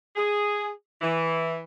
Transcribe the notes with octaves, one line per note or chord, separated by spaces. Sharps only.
G#4
E3